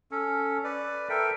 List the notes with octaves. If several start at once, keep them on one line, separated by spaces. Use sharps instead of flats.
C#4 A4
B4 D5
A4 A#4 E5 G5